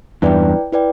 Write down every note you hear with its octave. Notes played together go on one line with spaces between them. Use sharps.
E2 G2 E4 B4 D5 G5
E4 B4 D5 G5